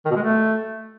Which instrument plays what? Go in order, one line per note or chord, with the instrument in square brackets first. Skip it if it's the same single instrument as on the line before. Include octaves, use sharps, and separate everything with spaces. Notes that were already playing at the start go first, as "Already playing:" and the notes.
[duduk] D#3
B2
G#3
A3